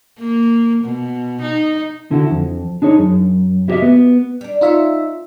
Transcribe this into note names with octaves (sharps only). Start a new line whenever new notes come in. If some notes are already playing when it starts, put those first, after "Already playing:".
A#3
B2
D#4
D3 E4 F#4
F2
D4 D#4 G#4 C#5
F#2
E4 F#4 G4 C5 D#5 E5
B3
G3 D4
D#4 F4 F#4 C#5 E5